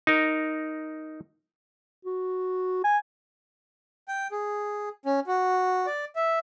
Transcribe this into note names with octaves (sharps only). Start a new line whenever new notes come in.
D#4 A#4
F#4
G#5
G5
G#4
C#4
F#4
D5
E5